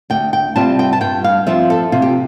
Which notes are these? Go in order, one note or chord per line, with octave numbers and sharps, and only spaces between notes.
D2 G5
G5
C3 G3 C4 F4 A5
G5
A5
G2 G5
F5
F3 C4 F4 E5
A4
C3 F4
G4